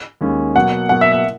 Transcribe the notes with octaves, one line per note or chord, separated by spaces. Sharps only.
D#2 D#3 G#3 C#4
B2 F#3 A#3 F#5
B2 F#3 A#3 F#5
E5
E5